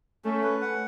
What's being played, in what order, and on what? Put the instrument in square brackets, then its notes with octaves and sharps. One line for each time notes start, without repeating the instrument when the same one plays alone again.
[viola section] A3 [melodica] C#4
[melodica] B4
F#5